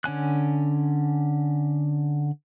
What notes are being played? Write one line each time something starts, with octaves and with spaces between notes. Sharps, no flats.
D3 C#4 G#5 F#6